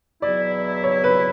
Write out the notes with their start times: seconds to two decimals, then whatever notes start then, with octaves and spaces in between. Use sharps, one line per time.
0.22 E2 B2 F#3 B3 E4 D5
0.84 C#5
1.04 B4